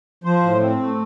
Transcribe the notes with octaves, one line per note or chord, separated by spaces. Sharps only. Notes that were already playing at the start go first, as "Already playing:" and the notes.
F3 C5
A2
C4
A3